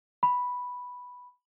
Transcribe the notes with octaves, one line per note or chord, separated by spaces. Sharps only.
B5